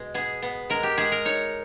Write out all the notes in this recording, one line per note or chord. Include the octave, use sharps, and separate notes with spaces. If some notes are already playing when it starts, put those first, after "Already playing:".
Already playing: B2 G#3
B3 G#4
B3
G#3 A#4
G4
G#3 G#4
A#4
D#4 C#5